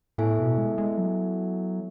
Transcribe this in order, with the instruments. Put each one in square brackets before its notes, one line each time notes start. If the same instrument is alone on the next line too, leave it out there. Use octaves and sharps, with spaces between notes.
[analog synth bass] A2 [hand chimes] B3 E4 A4 E5 G#5
[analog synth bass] B2
G#3
G#3
F#3